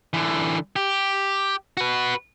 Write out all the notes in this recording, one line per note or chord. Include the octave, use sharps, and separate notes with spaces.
D3 E3
G4
F#4 B4